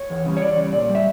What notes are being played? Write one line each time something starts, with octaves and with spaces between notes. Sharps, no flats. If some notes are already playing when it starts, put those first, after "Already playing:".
Already playing: C#5
E2
C#3 G3
C#5
E2 D5
C#3 G3
A#2 D5
G3
E5